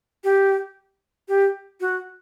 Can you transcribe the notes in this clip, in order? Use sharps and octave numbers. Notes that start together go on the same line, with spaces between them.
G4
G4
F#4